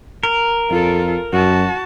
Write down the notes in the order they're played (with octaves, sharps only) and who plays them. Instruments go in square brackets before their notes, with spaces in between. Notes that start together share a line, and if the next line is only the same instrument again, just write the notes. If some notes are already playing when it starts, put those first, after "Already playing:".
[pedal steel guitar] A#4
[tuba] F2 [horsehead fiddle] F4 A4
[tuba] F#2 [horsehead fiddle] F#4 A5